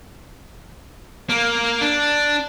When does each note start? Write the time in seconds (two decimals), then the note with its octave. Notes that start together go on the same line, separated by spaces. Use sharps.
1.29 A#3
1.81 D4